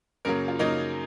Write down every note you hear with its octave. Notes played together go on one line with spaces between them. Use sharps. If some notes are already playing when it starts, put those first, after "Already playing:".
F#2 C#3 F#3 A#3 A#4
F4
F#2 C#3 F#3 A#3 D#4